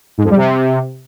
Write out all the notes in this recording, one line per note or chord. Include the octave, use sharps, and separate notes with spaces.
G#2
F2
G3
C3